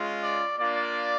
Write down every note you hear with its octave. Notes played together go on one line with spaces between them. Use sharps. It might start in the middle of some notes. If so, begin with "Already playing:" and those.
Already playing: G#3 C#4 F4
D5
A#3 D4 F4 D5